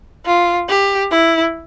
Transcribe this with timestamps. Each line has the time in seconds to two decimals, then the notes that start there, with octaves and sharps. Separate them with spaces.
0.26 F4
0.69 G4
1.11 E4